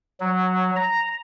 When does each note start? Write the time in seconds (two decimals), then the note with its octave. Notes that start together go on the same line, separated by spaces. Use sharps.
0.20 F#3
0.76 A#5